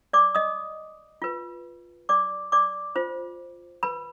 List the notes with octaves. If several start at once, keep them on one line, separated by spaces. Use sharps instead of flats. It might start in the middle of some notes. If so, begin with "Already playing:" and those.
D5 D6
D#5 D#6
F4 B4
D5 D6
D5 D6
F4 C5
B4 B5